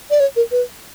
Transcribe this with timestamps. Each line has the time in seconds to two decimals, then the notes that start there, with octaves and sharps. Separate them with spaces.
0.10 D5
0.20 C#5
0.36 A#4
0.51 B4